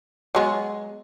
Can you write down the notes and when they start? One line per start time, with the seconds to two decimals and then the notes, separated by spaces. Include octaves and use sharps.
0.35 F#3 G#3 B3